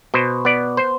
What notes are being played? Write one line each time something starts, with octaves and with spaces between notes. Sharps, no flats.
B2 C5
B3 D5
C5